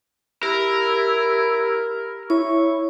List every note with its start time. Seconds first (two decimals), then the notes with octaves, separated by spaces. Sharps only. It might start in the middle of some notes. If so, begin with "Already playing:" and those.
0.43 E4 G4 A#4
2.30 E4 C#5 C#6